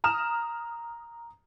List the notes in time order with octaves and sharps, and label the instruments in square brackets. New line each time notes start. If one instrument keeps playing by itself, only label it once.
[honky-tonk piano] A#5 D#6 F6 E7